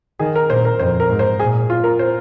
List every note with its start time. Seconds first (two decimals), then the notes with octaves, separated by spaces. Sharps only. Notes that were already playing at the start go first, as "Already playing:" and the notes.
0.19 D#3 G#4
0.36 A#4
0.50 A#2 C5
0.65 A#4
0.79 F2 C5
1.00 A#4
1.09 G#2
1.19 C5
1.39 A#2 G#4
1.70 F4
1.84 A#4
1.99 C5